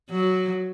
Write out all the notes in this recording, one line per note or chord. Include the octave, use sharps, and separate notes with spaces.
F#3